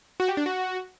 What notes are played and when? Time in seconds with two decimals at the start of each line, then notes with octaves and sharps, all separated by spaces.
0.20 F#4
0.28 G4
0.37 D4
0.46 F#4